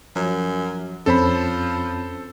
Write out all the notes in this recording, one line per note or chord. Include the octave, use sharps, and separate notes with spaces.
F#2 F3
F2 F3 C4 C#4 A4 C5 B5